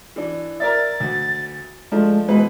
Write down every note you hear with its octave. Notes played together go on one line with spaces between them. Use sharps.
E3 D4
A#4 D5 E5 A6
D2
F3 G#3 A3 D4
B2 E3 G#3 B4